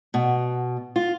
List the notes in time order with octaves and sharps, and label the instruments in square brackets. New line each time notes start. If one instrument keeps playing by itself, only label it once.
[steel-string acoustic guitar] B2
F4